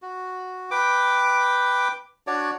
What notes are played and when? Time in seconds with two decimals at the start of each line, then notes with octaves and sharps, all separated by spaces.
0.02 F#4
0.71 B4 G5 D6
2.27 D4 F#4 C#5 D5